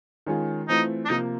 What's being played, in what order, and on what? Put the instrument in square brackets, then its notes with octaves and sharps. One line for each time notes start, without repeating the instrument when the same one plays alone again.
[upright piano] D#3 G#3 C#4 F4 G#4
[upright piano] E3 A3 C4 F4 [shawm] D#4
[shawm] D4
[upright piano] C3 F3 A#3 [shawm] D#4